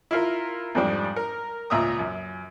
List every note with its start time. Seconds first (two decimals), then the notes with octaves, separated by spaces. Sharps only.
0.11 E4 F4 A#4
0.75 F2 G#2 G3 D4
1.16 A#4
1.70 C#2 A#2 E5 A#5 D#6
1.99 F#2